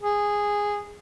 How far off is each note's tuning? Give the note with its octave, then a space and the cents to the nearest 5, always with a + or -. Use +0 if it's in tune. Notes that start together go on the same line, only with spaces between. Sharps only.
G#4 -10